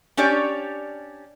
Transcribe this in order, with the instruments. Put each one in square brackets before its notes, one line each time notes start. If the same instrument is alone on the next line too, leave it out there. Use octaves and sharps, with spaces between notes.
[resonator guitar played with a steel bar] C#4 D4 G4 C#5 D5